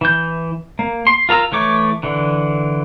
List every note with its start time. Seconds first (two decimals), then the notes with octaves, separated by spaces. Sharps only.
0.01 E3 G6
0.79 A#3
1.07 C6
1.29 F4 A#4 A#5 E6
1.52 E3 A3 C#5 D6
2.03 D3 E3